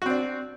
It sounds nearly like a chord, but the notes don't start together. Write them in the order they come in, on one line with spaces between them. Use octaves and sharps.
F#4 C4 D4